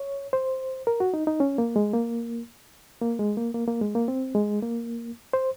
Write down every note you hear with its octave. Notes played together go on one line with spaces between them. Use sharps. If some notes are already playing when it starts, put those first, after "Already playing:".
Already playing: C#5
C5
A#4
F#4
D#4
D#4
C#4
A#3
G#3
A#3
A#3
G#3
A#3
A#3
A#3
G#3
A#3
C4
G#3
A#3
C5